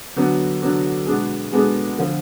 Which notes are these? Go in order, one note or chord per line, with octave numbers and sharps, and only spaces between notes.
D3 F#3 B3 D4 F#4
D3 F#3 B3 D4 F#4
B2 G#3 B3 D4 G#4
B2 G#3 B3 D4 G#4
D3 F3